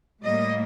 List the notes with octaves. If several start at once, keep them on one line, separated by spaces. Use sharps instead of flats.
A2 G3 A#3 D#5